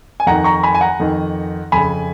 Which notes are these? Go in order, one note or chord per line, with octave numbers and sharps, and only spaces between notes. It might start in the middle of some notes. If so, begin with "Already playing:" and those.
G#5
F2 D#3 F#5 A#5
A#5 C#6
G#5 B5
G#5
F#5 A#5
F2 D#3
F2 C#3 G#5 B5